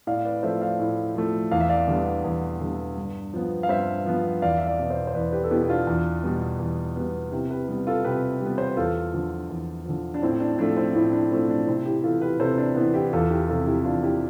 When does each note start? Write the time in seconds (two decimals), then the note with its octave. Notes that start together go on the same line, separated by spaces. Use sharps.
0.07 A2 D5 F5
0.25 B4 D5
0.43 F3 A3 C5 E5
0.61 D5 F5
0.80 A2
1.15 F3 A3
1.51 E2 F5
1.60 E5
1.69 D5 F5
1.88 D3 G3 B3
2.24 E2
2.61 D3 G3 B3
2.97 G2
3.34 F3 B3
3.63 F5
3.69 G2 C5 E5
4.06 F3 B3
4.42 E2 D5 F5
4.58 E5
4.66 D5 F5
4.78 B2 B3
4.90 C5 E5
5.07 C5
5.14 E2 B4 D5
5.32 G4 B4
5.44 A4
5.51 B2 B3 E4 G4
5.63 G4
5.69 D4 F4
5.87 E2
6.23 B2 G3 B3
6.59 E2
6.96 B2 G3 B3
7.32 C3 E4 G4
7.50 G4 B4
7.68 G3 B3
7.87 F4 A4
8.04 C3 G4 B4
8.41 G3 B3
8.58 C5
8.68 B4
8.77 E2 F4 A4
9.13 D3 F3
9.49 E2
9.86 D3 F3
10.14 D4
10.22 A2 C4
10.40 D4
10.58 F3 A3 D4
10.77 C4 E4
10.95 A2 C4 E4
11.13 D4
11.31 F3 A3 C4
11.49 D4
11.67 C3 C4 E4
11.86 E4 G4
12.03 E3 B3 F4 A4
12.21 G4 B4
12.40 C3 A4 C5
12.58 D4
12.76 E3 B3
12.94 E4 G4
13.13 E2 F4 A4
13.30 E4 G4
13.48 C3 F3 F4 A4
13.67 E4 G4
13.85 E2 D4 F4
14.03 E4 G4